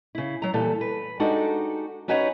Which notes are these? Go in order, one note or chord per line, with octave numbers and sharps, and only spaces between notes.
C#3 E4
F#3 A#5
A#2 E3 G3 A4
B4
G#3 D4 D#4 F#4 G4 A4
C#4 D#4 F#4 B4 C#5 F#5